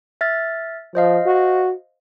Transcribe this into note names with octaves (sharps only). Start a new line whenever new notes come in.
E5 F6 A6
F3 C5 D#5 F5
F#4